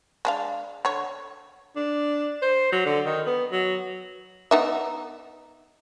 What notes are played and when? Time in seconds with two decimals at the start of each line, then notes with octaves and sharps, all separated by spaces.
0.25 G#3 D4 F5
0.85 D3 C#5
1.76 D4
2.42 C5
2.72 F#3
2.86 D3
3.06 D#3
3.27 B3
3.52 F#3
4.51 B3 D#4 E5